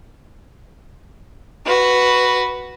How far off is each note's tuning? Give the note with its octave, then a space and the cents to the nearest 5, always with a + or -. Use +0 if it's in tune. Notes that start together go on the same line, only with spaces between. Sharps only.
F#4 +0 B4 +0